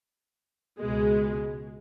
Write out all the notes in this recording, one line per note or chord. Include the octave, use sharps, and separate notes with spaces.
C#2 B2 G#3